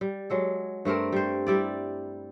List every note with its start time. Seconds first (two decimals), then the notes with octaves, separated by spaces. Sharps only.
0.01 G3
0.30 F#3 G#3 A4
0.85 G2 A3 C4 A#4
1.13 G3 C5
1.47 G3 E4 D5